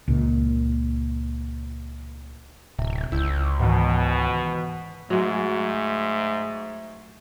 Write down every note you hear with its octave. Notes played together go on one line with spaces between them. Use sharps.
C#2 A#2
D1 C3
C#2 E4 E6 G6
G#2 B2 D#3 E3
G#2 F#3 G#3 A3